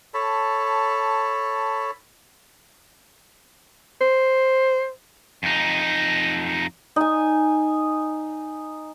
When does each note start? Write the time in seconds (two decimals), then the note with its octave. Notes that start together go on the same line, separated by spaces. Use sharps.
0.14 A4 C#5 A5 B5
4.01 C5
5.43 F2 D#4
6.96 D#4 G#5